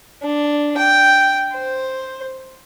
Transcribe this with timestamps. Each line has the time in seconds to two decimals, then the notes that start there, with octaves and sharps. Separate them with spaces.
0.23 D4
0.77 G5
1.53 C5